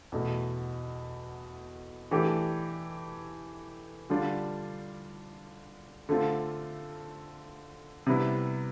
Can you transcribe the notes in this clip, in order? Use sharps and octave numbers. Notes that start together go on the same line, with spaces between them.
E2 B2 A3
E3 A3 D4 G4
D3 G3 D4 F4
D3 A3 C4 F4
C3 G3 B3 E4